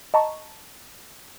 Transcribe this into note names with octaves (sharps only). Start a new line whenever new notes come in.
D#5 A5 A#5 C#6